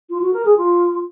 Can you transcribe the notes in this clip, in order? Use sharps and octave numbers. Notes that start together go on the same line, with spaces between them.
F4
F#4
A#4
G#4
F4